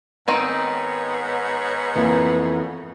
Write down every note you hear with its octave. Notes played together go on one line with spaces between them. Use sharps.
G#2 D#3 B3 C4 D#4 C#5
F2 E3 A#3